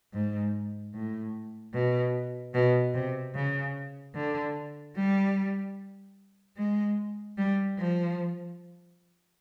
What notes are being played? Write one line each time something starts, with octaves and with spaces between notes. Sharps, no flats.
G#2
A2
B2
B2
C3
C#3
D3
G3
G#3
G3
F3